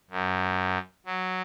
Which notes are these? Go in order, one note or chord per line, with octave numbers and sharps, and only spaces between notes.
F#2
F#3